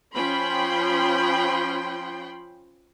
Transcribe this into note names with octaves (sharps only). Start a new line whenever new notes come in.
F3 C#4 G5 B5 C6